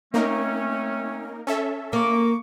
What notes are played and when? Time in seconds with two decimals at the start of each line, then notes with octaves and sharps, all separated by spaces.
0.14 A3 A#3 C4 C#4 D#4 A#4
1.47 C#4 A4 E5
1.93 A#3 A#5 C#6 D6